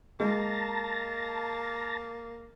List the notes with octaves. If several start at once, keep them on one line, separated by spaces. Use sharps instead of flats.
G#3 A#3 A5 A#5